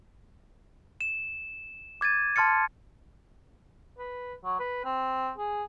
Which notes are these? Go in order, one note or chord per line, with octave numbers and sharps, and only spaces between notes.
E7
D6 G#6 A6 D#7
A5 C6 F6 A6 C#7
B4
F#3
B4
C4
G#4